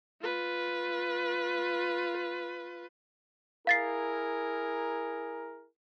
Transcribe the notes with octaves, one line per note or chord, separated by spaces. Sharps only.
F4 B4
E4 G#4 A#4 F5 A6 C7